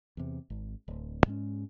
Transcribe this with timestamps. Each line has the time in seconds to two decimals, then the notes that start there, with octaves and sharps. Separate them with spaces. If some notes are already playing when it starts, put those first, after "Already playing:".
0.17 E2 C3
0.50 G#1
0.88 D1
1.26 G#2 G#3 C#4